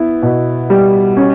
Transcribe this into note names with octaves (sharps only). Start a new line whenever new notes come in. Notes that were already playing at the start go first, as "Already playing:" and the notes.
Already playing: B3 E4
B2
G3
C#4